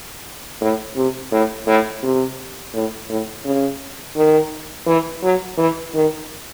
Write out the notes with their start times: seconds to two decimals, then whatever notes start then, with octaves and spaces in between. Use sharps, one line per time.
0.61 A2
0.96 C3
1.32 A2
1.67 A2
2.03 C3
2.74 A2
3.10 A2
3.45 C#3
4.16 D#3
4.87 E3
5.23 F#3
5.58 E3
5.94 D#3